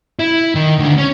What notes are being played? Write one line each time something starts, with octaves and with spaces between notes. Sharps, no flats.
E4
D#3
C#2 D3
C#4